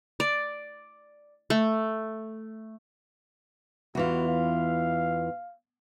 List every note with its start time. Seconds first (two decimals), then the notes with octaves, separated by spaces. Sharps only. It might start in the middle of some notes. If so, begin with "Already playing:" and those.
0.20 D5
1.50 A3
3.95 E2 E3 F4 F#4
4.28 F5